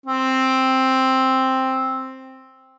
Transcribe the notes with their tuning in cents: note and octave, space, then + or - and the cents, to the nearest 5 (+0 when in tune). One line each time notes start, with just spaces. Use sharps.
C4 +5